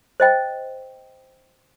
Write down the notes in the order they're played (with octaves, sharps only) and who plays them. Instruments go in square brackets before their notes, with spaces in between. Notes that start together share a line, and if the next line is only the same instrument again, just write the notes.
[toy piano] C5 D#5 G5